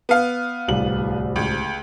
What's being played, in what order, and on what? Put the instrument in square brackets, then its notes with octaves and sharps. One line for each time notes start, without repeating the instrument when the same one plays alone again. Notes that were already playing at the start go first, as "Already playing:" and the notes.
[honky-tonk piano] B3 F5
[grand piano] D1 C2 F#7
[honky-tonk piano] C#2